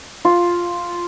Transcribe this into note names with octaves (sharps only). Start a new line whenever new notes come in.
F4